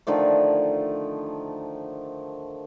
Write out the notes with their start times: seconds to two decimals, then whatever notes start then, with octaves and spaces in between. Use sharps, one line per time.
0.07 D3 D#3 F3 A3